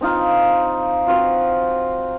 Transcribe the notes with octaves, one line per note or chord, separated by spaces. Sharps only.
C4 D#4 F4 F5
C4 F4 F#4